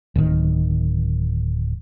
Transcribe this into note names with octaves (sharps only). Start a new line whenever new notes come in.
D1 D#3